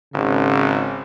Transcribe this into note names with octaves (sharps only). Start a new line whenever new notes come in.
G#1 C#3